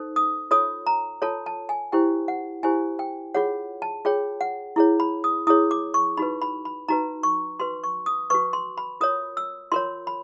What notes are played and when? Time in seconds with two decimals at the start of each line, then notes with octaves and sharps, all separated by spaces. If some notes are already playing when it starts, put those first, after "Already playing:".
Already playing: D#4 A4 C5
0.16 D#6
0.51 F4 A4 C#5 D#6
0.87 A#5
1.22 F4 A4 C#5 A5
1.46 A5
1.69 G#5
1.92 E4 G4 C5 G5
2.28 F#5
2.63 E4 G4 C5 G#5
2.99 G5
3.34 F4 G#4 C#5 F#5
3.82 A5
4.05 F4 G#4 C#5 G5
4.41 F#5
4.76 E4 G#4 C#5
5.00 B5
5.24 D#6
5.47 E4 G#4 C#5 D#6
5.71 D6
5.94 C#6
6.17 D#4 F#4 B4 B5
6.42 B5
6.65 B5
6.88 D#4 F#4 B4 A#5
7.23 C#6
7.60 F#4 B4 C6
7.84 C#6
8.06 D#6
8.30 F#4 B4 C#6
8.53 C6
8.78 B5
9.01 F4 A#4 C#5 D#6
9.37 E6
9.72 F4 A#4 C#5 C6
10.07 B5